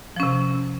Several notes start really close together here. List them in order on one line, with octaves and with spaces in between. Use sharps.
F3 C#4 C3